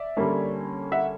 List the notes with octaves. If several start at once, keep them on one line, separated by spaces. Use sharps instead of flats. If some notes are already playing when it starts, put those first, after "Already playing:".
Already playing: D5 E5
D3 G3 A#3 C#4
E5 F#5